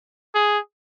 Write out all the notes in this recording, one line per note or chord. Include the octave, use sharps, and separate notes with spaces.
G#4